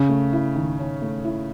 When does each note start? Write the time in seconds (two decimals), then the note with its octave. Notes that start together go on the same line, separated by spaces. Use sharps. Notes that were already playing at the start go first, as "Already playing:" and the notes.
Already playing: C#3 C#4
0.09 A3
0.33 E4
0.56 D#3
0.79 C#4
1.02 A3
1.25 E4